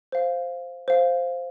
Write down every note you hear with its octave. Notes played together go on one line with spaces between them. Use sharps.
C5 F5
C5 F5